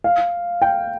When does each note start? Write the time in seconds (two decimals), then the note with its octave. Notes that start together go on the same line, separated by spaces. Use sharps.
0.04 F5
0.62 G5